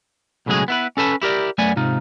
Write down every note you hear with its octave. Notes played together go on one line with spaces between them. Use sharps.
B1 A2 C#3 F#3 G#3 G#4
B3 E4 B4
C#4 A4 B4 A5
E4 G4 A#4 D5
F#2 A3 B3 D5 G#5
G#2 C3 D#4 F4